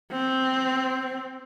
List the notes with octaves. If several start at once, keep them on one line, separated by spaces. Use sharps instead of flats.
C4